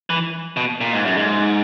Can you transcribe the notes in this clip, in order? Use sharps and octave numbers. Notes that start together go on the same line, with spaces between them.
E3
B2
A#2
G#2
F#2
G#2